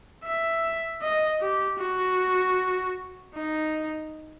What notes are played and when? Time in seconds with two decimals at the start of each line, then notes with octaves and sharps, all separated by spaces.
0.24 E5
1.02 D#5
1.41 G4
1.79 F#4
3.35 D#4